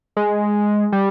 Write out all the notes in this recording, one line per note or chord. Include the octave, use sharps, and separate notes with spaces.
G#3
G3